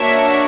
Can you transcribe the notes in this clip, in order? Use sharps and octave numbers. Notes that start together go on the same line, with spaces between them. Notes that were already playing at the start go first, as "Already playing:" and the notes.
Already playing: A#3 D4 F#4 C#5 E5